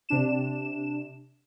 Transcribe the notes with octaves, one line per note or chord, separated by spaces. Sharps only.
C3 D4 E7